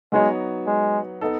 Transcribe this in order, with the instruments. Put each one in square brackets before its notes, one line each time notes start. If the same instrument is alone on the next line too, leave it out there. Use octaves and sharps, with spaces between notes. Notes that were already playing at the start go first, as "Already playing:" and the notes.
[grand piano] F#3 B3 D#4 F#4 C#5 [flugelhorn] G#3
[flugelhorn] G#3
[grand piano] B3 D#4 A4